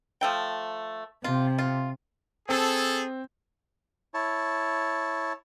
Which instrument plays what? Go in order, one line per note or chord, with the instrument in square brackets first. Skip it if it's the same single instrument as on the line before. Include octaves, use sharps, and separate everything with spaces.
[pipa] F3 A3 G5
[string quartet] C3 [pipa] F4
[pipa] F4
[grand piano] C4 [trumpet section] G#4 A4
[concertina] E4 C#5 A5